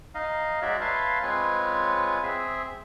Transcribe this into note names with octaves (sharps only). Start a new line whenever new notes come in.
D#4 D#5 F5
G#3 D#4 F#4 C#5 D5 E5
B4 C#5 E5 F5 A5 C6
G#3 C4 F4 B4 C#5 G#5
C4 G#4 E5